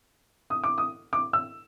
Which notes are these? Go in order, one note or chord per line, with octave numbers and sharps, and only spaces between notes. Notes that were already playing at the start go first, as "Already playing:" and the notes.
D#6
D6
D#6
D6
E6